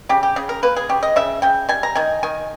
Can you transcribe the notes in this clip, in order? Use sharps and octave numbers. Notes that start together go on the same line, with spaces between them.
C#3 G4
G4
C#3 G#4
A#4
A#3 B4
G#4
C#3 G4
D#5
C#3 E5
C#3 G5
G3 G#5
A#5
D#3 G#5
D#3 G#5